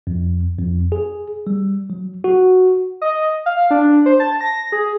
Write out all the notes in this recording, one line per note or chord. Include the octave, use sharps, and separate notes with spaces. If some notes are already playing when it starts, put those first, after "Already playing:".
F2
F2
G#4
G3
F#3
F#4
D#5
F5
D4
C5
A5
A#6
G#4